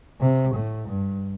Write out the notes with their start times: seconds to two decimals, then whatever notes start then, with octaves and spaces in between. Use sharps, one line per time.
0.20 C3
0.54 A2
0.88 G2